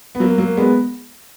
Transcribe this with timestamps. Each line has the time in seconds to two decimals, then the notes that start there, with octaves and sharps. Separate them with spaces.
0.15 B3
0.20 F#3 A#3
0.38 F#3 A#3
0.57 G#3 B3